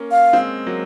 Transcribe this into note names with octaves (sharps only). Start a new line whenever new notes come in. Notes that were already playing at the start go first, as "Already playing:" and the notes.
Already playing: A#3 C#4
F5
G#3 C4
F#3 A#3